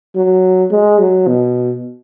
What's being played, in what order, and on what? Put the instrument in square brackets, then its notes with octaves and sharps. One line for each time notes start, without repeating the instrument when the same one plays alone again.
[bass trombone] F#3
G#3
F#3
B2